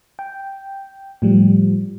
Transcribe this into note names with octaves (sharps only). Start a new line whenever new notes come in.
G5
A2 F3 G3